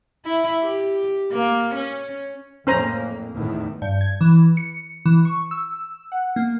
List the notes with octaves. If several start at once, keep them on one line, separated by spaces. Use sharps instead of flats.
E4
G4
A#3
C#4
F2 A2 A#3 C#4 C5 A#5
E2 A2 D#3
G2
G#6
E3
C#7
E3
C#6
E6
F#5
A#3